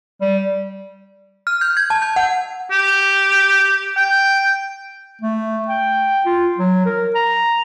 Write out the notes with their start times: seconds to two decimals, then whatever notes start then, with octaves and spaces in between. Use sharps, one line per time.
0.21 G3
1.47 F6
1.61 G6
1.77 G#6
1.90 A5
2.02 G6
2.16 F#5
2.71 G4
3.97 G5
5.21 A3
5.68 G5
6.25 F4
6.58 F#3
6.86 A#4
7.15 A#5